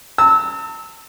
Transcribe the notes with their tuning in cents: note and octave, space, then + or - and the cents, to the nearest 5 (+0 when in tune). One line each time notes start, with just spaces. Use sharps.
A5 +40 E6 -25